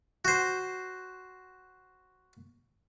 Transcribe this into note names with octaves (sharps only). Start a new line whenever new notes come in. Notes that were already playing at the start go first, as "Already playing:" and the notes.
F#4 C5